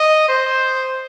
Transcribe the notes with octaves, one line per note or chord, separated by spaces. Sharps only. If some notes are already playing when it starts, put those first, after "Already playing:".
Already playing: D#5
C5